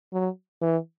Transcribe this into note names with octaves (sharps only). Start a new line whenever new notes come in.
F#3
E3